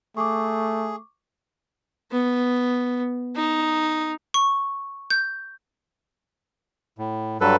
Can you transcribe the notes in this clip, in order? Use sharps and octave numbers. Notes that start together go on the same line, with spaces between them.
A3 G#4 C#6 D6
B3
D#4
C#6
G6
A2
G2 F#3 A4 B4